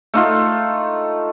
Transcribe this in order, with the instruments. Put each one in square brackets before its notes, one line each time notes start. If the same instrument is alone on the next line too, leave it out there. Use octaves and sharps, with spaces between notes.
[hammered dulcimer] A3 D#4 F4